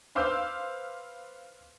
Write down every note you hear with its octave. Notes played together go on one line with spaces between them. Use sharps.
B4 C5 F5 D6 E6 G6